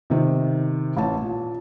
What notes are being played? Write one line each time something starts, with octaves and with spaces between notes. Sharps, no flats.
C3 D#3
A1 A5
A#2